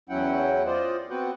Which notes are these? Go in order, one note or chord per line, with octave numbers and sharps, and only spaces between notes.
E2 F#3 C#4 E4 F#5 G5
F4 C5 D5 D#5
B3 C4 F#4 B4 F#5 G5